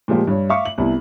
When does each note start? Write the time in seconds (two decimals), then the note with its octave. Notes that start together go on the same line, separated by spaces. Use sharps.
0.08 A#2 F3 G#3 F4 G4
0.27 G2 C#5
0.49 E5 F5 C#6 D6
0.65 F#7
0.78 C2 B3 E4